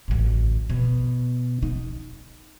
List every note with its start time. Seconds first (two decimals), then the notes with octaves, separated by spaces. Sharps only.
0.08 A1 D2
0.70 B2
1.63 D#4